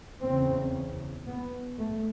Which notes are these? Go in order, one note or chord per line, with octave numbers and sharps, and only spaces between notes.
E2 C#3 C4
B3
A3